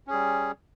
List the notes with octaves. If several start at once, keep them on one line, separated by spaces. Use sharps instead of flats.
G3 C#4 G#4